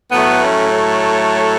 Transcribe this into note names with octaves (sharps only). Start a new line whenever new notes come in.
A2 F#3 A3 B3
C#4
A4 C#5